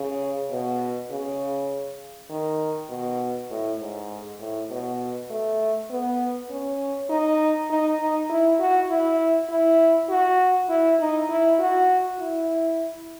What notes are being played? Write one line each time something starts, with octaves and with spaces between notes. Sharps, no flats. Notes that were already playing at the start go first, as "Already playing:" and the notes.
Already playing: C#3
B2
C#3
D#3
B2
A2
G#2
A2
B2
A3
B3
C#4
D#4
D#4
D#4
E4
F#4
E4
E4
F#4
E4
D#4
E4
F#4
E4